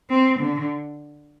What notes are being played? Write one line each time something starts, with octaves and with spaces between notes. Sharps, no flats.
C4
D3